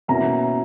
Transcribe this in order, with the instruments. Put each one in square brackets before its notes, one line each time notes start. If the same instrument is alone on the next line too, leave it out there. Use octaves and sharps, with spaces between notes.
[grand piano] B2 A#3 C#4 E4 [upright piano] A#5